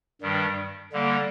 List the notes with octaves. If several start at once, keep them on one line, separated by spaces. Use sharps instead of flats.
G2 D#3 G3
D3 G3 A#3